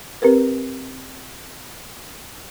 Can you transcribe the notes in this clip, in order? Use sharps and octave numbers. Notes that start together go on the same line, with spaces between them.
C4 G4 A#4 B4